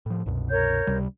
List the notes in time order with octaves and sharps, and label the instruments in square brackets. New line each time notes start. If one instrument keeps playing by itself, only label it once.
[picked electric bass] A2 F3
C2 F#2 B2
[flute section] A#4 C#5 G6
[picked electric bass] C#2 C3 G3